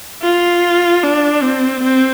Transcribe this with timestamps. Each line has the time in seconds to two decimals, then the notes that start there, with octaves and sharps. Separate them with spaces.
0.22 F4
1.03 D4
1.43 C4
1.84 C4